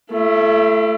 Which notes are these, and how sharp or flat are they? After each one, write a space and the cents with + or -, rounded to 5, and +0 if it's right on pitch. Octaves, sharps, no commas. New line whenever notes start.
A3 +0 E4 +45